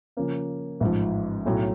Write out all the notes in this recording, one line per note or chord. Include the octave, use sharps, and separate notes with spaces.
C#3 F3 A#3 C#4
A1 G#2 F3
B1 A2 F#3